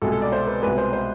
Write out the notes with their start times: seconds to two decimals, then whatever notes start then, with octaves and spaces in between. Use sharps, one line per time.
0.02 C2 B2 G#3 A4
0.12 A4
0.22 D5
0.32 C5
0.47 B4
0.62 C2 B2 G#3 B4
0.78 C5
0.93 C5